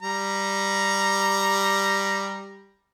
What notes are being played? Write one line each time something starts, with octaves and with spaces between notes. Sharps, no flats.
G3 A#5